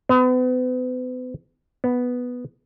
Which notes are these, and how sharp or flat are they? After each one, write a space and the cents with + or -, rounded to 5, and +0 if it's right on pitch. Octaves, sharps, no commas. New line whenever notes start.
B3 +40
B3 +0